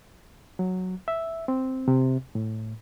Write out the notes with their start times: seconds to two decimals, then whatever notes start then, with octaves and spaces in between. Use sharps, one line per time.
0.59 F#3
1.08 E5
1.48 C4
1.88 C3
2.35 A2